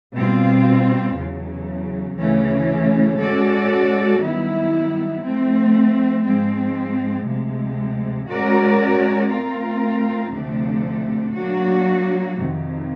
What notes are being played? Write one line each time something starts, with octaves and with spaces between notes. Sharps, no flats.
B2 G3 C4 F4
E2 C#3 F#3
D2 C#3 E3 A3 C#4
G#3 C#4 F#4 A4 D5
F#2 D#3 G3 B3 E4
F3 A3 C4
G#2 F3 G#3 C4
D2 C3 F3 G#3
G#3 C#4 F#4 A#4 D5
A3 C4 F4 A#4
D2 C3 F3 A3 D4
F#3 A#3 D4 F#4
F2 C3 D#3